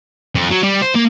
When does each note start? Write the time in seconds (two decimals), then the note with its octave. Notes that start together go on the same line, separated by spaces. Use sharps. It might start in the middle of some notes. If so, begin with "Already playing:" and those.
0.35 F2
0.51 F#3
0.63 G3
0.82 C5
0.95 A#3